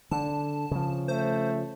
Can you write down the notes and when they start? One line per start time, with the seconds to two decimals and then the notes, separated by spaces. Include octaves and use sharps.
0.11 D3 A5
0.71 C#3 F3
1.08 A3 C5